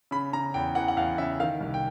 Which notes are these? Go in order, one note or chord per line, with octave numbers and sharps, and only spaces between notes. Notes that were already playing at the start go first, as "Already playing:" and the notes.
C#3 B5
C#3 A#5
E2 G5
E3 F#5
F#5
E2 F5
C#3 E5
D#3 F5
C2
G5